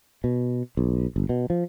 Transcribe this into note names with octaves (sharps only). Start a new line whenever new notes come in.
B2
B1
G1
B2
F3